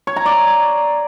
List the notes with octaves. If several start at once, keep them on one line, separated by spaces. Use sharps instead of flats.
C#5
A#5
D5